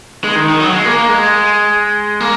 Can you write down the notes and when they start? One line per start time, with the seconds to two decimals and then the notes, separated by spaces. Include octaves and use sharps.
0.24 G#3
0.36 D#3
0.49 D#3
0.60 F#3
0.73 G#3
0.85 A#3
0.98 A#3
1.09 G#3
2.20 A#3